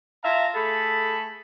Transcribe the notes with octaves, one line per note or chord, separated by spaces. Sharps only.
F4 E5 F5 A5 A#5
A3 G#4 A4 B5